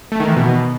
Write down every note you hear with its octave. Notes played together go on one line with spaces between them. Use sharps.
A3
D#3
E3
B2